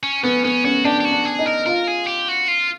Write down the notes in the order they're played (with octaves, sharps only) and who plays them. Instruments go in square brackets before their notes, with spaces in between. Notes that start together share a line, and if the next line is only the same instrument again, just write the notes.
[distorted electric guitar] C#4
[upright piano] B3 [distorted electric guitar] C#4
[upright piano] B3 [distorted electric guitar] C#4
[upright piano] C#4 [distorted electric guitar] F#4
[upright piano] D4 [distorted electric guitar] G4
[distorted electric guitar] G4
F#4
[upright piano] D4
[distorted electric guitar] G#4
[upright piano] D#4
[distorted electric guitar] A#4
[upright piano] F4 [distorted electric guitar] A#4
[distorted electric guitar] G#4
G4
F#4
F4